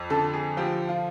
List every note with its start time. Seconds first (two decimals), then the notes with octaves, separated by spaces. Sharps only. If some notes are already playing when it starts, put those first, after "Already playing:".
Already playing: F2
0.10 D3 A4
0.34 G#4
0.57 F3 G4
0.89 F4